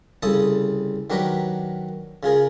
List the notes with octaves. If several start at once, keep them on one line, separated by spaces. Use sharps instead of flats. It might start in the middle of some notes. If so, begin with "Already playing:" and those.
C2 C#3 A4 A5 D#6
D#3 F#3 D4 G4 A#4 B4
C#3 F4 G#4 A#4